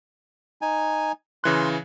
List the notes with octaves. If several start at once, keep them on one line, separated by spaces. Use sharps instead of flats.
D#4 G#5
C#3 E3 C6 F#6